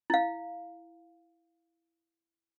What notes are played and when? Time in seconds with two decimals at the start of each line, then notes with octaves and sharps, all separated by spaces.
0.10 E4 F5